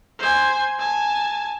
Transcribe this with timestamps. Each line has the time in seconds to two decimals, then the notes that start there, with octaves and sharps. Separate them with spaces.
0.19 C5 G#5
0.79 G#5 A5